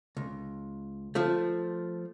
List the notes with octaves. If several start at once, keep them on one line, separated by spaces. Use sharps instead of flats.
C#2
F3 A3